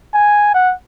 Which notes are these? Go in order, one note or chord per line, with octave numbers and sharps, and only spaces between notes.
G#5
F#5